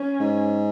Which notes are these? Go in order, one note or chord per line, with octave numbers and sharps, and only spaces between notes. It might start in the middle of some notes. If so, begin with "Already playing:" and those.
Already playing: C#4
G#2